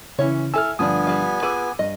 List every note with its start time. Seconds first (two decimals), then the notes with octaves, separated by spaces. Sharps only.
0.19 C#3 E3 C#4 E4 C#5
0.54 E4 A4 E5 G#5 E6 F6
0.79 G2 D3 F3 A3 B3 D4 G#5 D#6
1.07 G3 F4
1.42 F4 G#4 B4 D6 E6 D#7
1.79 G2 D#5